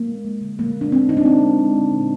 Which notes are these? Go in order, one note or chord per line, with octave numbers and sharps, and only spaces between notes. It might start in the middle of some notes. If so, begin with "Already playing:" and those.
Already playing: A#3
G#3
G#3
D3
D3 A#3
G#3
D4
G#3 C4
D3 D#4
D4
D3 C4
G#3
G#3
D3
A#2